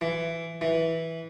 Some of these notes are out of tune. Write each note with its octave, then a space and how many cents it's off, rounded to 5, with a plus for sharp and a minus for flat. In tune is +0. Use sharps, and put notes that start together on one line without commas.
E3 +15
E3 -10